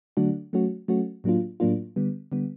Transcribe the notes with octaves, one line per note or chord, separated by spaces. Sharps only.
D3 F#3 A3 D4 F#4
F#3 A3 C#4 F#4
F#3 A3 C#4 F#4
A2 F#3 A#3 D4 F4
A2 F#3 A#3 D4 F4
D3 G3 B3
D3 G3 B3